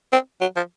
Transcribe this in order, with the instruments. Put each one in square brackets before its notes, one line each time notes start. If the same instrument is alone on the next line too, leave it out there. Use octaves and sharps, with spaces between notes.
[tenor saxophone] C4
F#3
F3